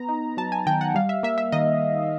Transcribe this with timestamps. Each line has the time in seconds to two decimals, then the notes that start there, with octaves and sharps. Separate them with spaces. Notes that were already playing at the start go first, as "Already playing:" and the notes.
Already playing: B3 A#5
0.09 D#4
0.37 F#3 A5
0.52 G#5
0.66 D#3 G5
0.81 F#5
0.95 G3 F5
1.09 E5
1.23 A#3 E5
1.38 E5
1.52 D#3 D#5